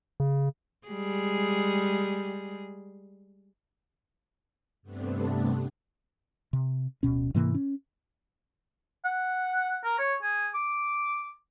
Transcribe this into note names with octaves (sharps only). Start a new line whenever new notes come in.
C#3
G3 G#3 G#4
G2 C3 A3 B3 C4 D4
C3
D1 B2 C#4
G#2 C3 E3 A#3
C#4
F#5
A#4
C#5
G#4
D6